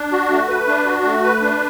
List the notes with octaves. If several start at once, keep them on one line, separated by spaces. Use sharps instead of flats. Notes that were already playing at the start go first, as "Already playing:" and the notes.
Already playing: D4
F#4
A3
B4
D4
F#4
A3
B4
D4